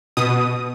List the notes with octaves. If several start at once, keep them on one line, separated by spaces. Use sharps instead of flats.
B2 D#6